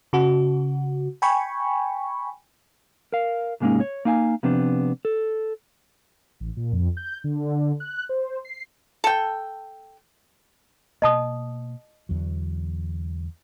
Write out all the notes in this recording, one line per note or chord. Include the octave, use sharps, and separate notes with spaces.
C#3 F#4
G5 G#5 B5 C#6
A#4 F5
C2 G#2 G#3 A#3 C#4 D#4
C#5
A#3 D#4 F5 G5 G#5
C3 F3 B3 C4 D4
A4
A1
A#2
F2
G6
D3
F#6
C5
C7
A4 G5
B2 A#3 D#5 A5 D#6
E2 D3 F#3